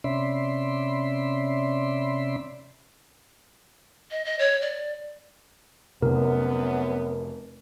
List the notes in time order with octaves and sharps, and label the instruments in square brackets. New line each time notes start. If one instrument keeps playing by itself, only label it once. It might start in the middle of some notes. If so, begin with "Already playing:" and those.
[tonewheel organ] C3 C#4 D5 E5 B5 C6
[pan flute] D#5
D#5
C#5
D5
[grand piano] F1 [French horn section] F#2 B3 [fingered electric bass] C3 [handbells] A#4